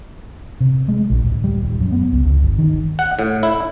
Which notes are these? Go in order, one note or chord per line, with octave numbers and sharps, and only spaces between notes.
C3
G#3
A#1
D1
G3
D#1
F#2
B3
C#2
C#2
G1
D#3
F#5
A2
E4